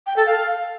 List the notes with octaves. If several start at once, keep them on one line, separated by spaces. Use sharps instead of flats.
G5
A4
F5